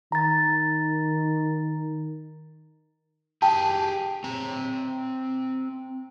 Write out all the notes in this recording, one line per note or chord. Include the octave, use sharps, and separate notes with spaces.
D#3 A#5 A6
G4 G#4 G5 A5
C4 A#5